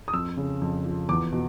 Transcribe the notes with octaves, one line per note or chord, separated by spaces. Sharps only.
D#6
F2 E6
C#3
F2
F3
E2 D6
B2